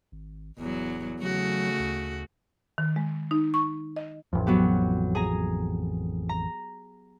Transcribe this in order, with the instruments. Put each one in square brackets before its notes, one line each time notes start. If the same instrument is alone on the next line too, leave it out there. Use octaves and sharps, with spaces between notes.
[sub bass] G#1
[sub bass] D1 [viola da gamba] E2 F#3
[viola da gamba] C#3 A3 F#4 [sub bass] F#3
[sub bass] D2
[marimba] D#3
G#3
D#4
C#6
D#5
[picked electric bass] A1 F2
[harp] F#3 B3 G4
G#4 G#5 A#5
A#5